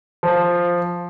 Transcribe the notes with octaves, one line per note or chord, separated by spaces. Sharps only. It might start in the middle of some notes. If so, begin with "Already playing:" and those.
F3